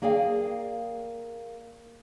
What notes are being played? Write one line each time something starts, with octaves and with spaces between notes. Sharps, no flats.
A#3 G#4 D5 F5 G5